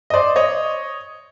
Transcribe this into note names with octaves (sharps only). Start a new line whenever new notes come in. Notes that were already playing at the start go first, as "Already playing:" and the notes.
D#5
C5 D5
C#5 D#5